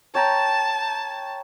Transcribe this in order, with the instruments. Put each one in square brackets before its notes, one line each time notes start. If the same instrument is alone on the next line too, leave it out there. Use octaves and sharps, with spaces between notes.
[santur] C#5 G5 A#5 [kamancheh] A5